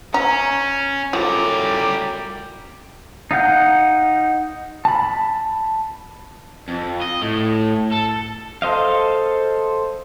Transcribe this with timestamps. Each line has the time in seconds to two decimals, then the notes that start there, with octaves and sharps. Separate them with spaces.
0.14 C#4 A#5
1.13 F#2 A2 G3 F4 A#5 D6
3.31 D#4 F5 F#5 G6
4.85 A5 B5
6.68 F2
7.01 D#5
7.22 A2
7.92 A4
8.62 A4 C5 D#5 F5